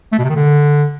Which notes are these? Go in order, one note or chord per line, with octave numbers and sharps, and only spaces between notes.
A3
B2
C3
D#3
D3